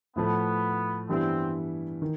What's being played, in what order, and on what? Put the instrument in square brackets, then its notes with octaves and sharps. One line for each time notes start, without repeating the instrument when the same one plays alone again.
[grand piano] A2 F3 A3 [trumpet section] B3
[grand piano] G2 E3 G3 B3 E4 [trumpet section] C4
[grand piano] D#3